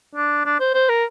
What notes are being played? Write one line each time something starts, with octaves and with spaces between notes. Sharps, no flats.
D4
D4
C5
C5
A#4